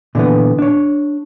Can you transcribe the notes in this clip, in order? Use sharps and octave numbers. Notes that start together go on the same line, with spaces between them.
A#2 D3 E3 B3
D4 C#5